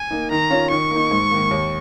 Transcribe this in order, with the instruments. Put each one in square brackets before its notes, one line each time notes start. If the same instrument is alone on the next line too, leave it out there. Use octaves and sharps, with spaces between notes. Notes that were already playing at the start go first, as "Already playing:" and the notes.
Already playing: [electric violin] G#5
[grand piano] A#3 D#4
[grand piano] D#3 [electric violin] A#5
[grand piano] C#4 F4
[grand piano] D#3 [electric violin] C#6
[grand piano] A#3 D#4
G#2
D#3 A#3
D#2